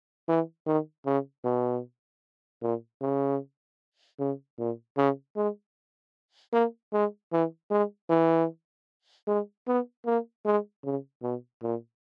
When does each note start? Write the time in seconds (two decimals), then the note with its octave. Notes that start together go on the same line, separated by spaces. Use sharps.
0.29 E3
0.67 D#3
1.06 C#3
1.45 B2
2.62 A#2
3.02 C#3
4.20 C#3
4.59 A#2
4.97 C#3
5.36 G#3
6.53 A#3
6.93 G#3
7.32 E3
7.71 G#3
8.10 E3
9.28 G#3
9.67 B3
10.06 A#3
10.45 G#3
10.85 C#3
11.23 B2
11.63 A#2